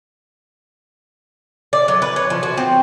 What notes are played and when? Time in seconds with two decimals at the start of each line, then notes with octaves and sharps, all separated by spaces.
1.73 D5
1.88 F#3
2.02 B4
2.16 C#5
2.30 F3
2.43 F#4
2.57 C4